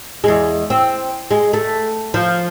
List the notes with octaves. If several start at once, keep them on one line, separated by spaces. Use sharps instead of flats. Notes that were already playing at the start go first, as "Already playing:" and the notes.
E2 G#3
C4
G#3
A3
F3